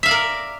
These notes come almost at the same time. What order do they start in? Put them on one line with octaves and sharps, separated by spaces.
E5 F5 D5 A#4